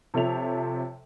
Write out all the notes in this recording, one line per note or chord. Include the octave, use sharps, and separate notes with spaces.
C3 F3 A4 C#5 E5 F7